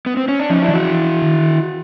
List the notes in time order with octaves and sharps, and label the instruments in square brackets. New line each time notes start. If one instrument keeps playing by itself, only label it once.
[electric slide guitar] B3
C4
C#4
D4
[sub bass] F3 [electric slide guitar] C#4 D#4
[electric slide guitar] D4 E4
[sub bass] E3
[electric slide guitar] E4 F#4
[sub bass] D#3